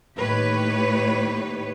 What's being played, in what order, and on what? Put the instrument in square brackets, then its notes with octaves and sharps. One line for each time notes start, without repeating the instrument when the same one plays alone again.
[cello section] A2 D#3 A#3 G4 B4 C#5